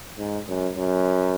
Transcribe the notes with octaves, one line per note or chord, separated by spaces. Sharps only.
G#2
F#2
F#2